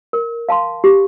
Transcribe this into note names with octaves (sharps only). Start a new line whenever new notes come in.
A#4
F5 A5 C6
G4